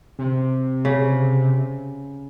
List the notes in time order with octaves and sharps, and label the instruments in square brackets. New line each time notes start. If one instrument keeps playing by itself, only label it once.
[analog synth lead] C3
[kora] C#3